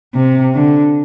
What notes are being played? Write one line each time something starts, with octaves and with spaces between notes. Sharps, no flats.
C3
D3